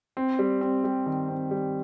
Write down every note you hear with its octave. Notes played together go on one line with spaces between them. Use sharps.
C4
G3
C4
G3
D#3
C4
G3